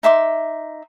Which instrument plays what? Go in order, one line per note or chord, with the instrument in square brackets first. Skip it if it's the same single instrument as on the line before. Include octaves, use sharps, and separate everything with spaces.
[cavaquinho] D#4 E5 C6 D6